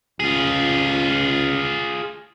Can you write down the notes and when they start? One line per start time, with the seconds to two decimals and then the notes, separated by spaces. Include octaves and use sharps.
0.20 C#2 F4 G#4